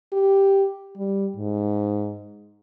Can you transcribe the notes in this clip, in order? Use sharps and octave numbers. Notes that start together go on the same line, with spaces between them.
G4
G3
G#2